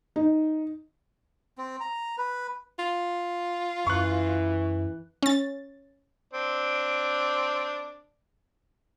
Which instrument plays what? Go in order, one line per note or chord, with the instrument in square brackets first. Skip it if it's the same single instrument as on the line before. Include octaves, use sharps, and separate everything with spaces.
[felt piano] D#4
[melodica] C4
A#5
B4
[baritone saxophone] F4
[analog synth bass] F#2 [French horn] E3 [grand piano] C#6 F#6
[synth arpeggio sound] C#4 A6
[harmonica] C4 D4